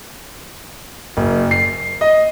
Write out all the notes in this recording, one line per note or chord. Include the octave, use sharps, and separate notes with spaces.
F#1
C7
D#5